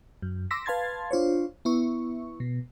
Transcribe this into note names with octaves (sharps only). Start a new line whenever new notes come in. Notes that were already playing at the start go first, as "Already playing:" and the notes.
F#2
C6 D6 E6 A#6 B6
B4 F5 A5 C6 G#6 A6
D4 F4 C5 C#5
B3 E4 C#6
B2